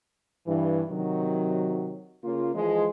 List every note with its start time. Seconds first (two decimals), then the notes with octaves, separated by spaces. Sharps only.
0.46 G2 E3
0.89 C3 D#3 F#3
2.24 C#3 A#3 F4
2.55 E3 F3 G#3